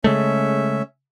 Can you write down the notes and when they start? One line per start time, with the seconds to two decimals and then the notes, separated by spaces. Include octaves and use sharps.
0.04 C#3 G#3 A3 C#4 E5